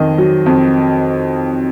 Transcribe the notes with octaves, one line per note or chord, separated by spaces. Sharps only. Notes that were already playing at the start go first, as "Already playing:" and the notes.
Already playing: F2 D#3 D#5
F#3
F2